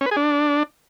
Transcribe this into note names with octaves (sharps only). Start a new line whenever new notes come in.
C#4
B4
G#4
D4